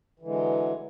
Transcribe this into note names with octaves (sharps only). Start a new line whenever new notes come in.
D3 E3 F#3 G#3